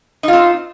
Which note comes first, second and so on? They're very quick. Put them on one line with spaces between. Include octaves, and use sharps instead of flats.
D#4 F4 C4